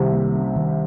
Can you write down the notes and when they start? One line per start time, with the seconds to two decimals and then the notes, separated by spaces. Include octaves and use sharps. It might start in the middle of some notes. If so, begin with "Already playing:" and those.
Already playing: C2 C3 D#3
0.13 A#3
0.35 C#4
0.56 D#3